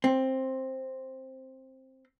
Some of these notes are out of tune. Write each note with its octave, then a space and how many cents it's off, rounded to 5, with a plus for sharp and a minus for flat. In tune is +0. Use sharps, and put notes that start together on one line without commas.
C4 +10